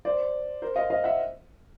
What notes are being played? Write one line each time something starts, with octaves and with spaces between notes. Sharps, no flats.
C5 D5
A#4 C5
D#5 F5
D#5 F5
E5 F#5